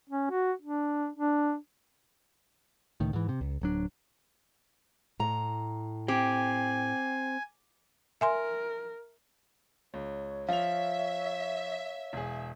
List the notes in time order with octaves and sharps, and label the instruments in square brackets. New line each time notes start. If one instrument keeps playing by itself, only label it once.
[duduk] C#4
F#4
D4
D4
[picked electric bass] C#2 A2 D#3
G#2 E3
C3
C#2
D1 F#3 D4
[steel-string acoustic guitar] A2 A#5
[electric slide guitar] C4 [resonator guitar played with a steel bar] G4 [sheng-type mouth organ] G#5
[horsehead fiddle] A#4 [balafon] E5 G#5 C6
[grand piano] C#2 [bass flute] C#5
[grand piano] F3 F7 [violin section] E5 [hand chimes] F5
[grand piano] E1 G#4